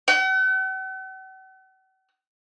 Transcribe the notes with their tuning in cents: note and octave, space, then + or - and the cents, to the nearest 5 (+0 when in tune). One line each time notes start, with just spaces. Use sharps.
F#5 +45